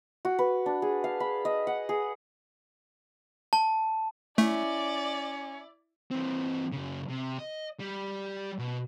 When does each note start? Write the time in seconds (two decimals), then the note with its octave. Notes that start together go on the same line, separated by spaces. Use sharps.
0.25 F#4
0.39 B4
0.66 D4
0.82 G#4
1.04 F5
1.20 B5
1.45 D#5
1.67 F#5
1.89 G#4
3.53 A5
4.38 A3 C#4 E4 D5
6.11 E3 C4
6.72 F#2 C#3
7.09 C3
7.39 D#5
7.80 G3
8.59 B2